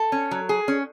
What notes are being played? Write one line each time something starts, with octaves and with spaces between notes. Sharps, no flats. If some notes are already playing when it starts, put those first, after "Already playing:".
Already playing: A4
C#4
F#3
G#4
C#4